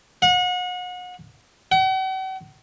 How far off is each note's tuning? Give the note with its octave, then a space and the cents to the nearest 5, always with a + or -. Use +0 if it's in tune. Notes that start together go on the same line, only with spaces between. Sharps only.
F#5 -35
F#5 +45